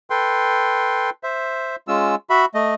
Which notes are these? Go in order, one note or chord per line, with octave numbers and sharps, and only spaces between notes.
A4 B4 G5 C6
C5 E5
G#3 C#4 F4 E6
F#4 E5 B5
A3 D#5